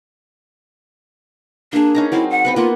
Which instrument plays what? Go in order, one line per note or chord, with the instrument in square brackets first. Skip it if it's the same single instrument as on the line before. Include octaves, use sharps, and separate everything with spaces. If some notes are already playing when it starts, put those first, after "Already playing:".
[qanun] A#3 G#4 [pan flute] D4
[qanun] C#4 D#4 A#5
[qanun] F#3 C4 F5 [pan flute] E4
[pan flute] F#5
[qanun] B3 C4 B4
[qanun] A#3 B3 F#5 [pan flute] F4